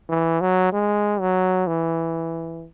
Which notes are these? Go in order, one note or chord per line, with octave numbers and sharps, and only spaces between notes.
E3
F#3
G#3
F#3
E3